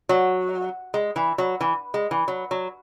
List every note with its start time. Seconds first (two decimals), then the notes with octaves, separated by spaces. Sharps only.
0.09 F#3
0.94 G#3
1.16 E3
1.38 F#3
1.61 E3
1.94 G#3
2.11 E3
2.28 F#3
2.51 F#3